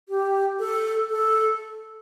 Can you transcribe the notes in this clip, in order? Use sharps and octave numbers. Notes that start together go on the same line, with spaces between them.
G4
A4
A4